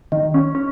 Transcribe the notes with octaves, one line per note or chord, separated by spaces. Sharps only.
D#3
C#4
C#4